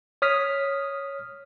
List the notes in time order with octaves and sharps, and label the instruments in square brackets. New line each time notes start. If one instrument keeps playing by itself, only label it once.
[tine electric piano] C#5 D#6 F6 B6